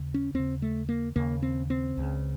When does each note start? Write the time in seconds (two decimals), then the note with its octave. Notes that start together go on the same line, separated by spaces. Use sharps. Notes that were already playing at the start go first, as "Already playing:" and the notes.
Already playing: D#2 C#3
0.14 C#4
0.34 D#2 C#3 C4
0.62 A3
0.89 A#3
1.16 D#2 C#3 A#3
1.42 C4
1.70 C4
1.97 C#2 C#3